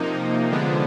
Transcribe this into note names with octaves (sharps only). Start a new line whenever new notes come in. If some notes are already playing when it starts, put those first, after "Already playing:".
Already playing: C3 F3 A#3 D#4
D3 F3 G#3 B3 D4